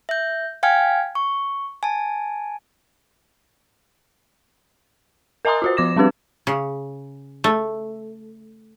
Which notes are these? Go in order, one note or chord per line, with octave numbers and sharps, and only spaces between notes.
E5 G6
F5 G5 G#5 F6 G#6
C#6
G#5 A5
A#4 D#5 G#5 A#5 C6 D#6
F4 F#4 C5
F3 D6 A#6 E7
G3 C4 D4 G4 B4
C#3
A3